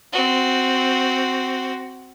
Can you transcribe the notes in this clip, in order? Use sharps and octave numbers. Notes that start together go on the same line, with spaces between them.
C4 F#4